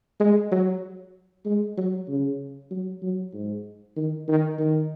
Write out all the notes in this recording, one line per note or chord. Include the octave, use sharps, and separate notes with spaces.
G#3
F#3
G#3
F#3
C#3
F#3
F#3
G#2
D#3
D#3
D#3